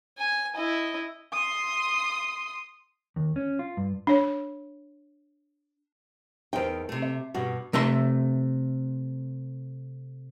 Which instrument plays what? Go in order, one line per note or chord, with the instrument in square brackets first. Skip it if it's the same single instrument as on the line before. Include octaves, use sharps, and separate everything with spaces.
[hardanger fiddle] G#5
E4 D#5
[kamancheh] C6 D#6
[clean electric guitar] D#2
C#4
F4
G2
[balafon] D4 C#5
[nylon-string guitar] E2 G5 [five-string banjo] D#4 A#4 C5
[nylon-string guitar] C3 A3
[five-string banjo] E5
[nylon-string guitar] G2 B2 G3 [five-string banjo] F#4
[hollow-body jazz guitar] C3 A3 E5 C6